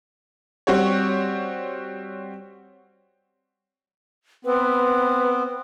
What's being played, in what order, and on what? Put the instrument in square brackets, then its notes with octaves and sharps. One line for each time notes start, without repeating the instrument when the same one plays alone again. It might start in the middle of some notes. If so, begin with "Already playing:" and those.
[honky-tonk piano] G3 C4 F#4 G4 C#5
[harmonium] B3 C4 [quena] B4